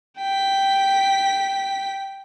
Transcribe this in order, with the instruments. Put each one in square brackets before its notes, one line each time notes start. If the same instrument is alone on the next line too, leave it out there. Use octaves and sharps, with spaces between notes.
[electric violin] G5 B6